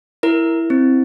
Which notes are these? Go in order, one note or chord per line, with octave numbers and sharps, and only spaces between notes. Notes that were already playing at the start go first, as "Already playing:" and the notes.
E4 A#4
C4